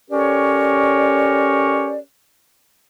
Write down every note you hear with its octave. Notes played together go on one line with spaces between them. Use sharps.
C#4 G4 A4 A#4 C#5 D5